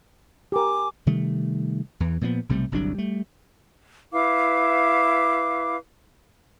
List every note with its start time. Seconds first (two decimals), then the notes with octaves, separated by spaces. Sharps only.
0.52 G4 A#4 G#5 D6
1.06 C3 D#3 G3 A3
2.00 E2 E3
2.21 A#2 F3 G#3 B3
2.49 B1 C3 G3 A3
2.72 G1 C2 F#3 D4
2.95 G3 A3
4.12 E4 B4 F5 D6